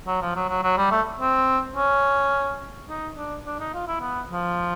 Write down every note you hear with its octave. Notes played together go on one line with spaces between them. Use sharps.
F#3
F3
F#3
F#3
F#3
G3
A3
C4
C#4
D#4
D4
D4
D#4
F4
E4
B3
F3